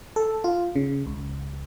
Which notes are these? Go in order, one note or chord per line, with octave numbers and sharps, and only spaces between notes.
A4
F4
C#3
C#2